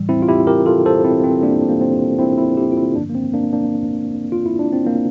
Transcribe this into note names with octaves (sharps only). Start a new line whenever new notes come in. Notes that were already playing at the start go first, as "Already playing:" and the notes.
Already playing: A2 E3 G3
C4 E4
F4
E4 G4
G4 A#4
F4 A4
A4 C5
C4 E4
C4
A#3 D4
A#3
C4
C4 E4
C4 E4
E4 G4
F4
C4 E4
G2 D3 F3 A#3 D4
A#3
C4
A#3 D4
A#3 D4
F4
E4
D4
C4
A#3